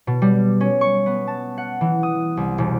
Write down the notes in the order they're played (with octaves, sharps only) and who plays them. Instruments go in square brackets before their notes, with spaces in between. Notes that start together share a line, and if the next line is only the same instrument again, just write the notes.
[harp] B2
G3
C#4
C#6
B3
A5
F#5
E3
D#6
C2
E1